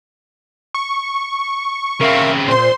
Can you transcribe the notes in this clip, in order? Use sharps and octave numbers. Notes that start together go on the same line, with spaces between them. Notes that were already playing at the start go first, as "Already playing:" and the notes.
C#6
C#3 C4 A#4 E5 F5
A#2 C5 C6